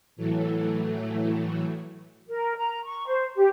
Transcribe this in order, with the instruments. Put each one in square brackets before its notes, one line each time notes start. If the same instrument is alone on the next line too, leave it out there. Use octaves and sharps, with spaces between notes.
[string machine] A2 E3 F#3 A3
[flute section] A#4
A#5
C#6
C5
G4